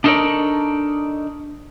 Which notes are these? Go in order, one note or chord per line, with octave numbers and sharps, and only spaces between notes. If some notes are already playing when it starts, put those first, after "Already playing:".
D4 D#4 A4 A#4 C#5 D5